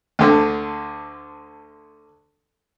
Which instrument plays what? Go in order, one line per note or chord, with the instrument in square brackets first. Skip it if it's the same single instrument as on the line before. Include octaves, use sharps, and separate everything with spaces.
[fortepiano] D2 D3